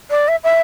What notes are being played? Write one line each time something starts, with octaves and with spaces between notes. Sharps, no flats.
D5
E5
E5